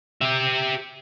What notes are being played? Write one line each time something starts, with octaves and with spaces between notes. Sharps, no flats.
G4 E5